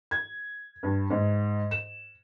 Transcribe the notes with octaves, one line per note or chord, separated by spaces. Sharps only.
G#6
G2
G#2
E7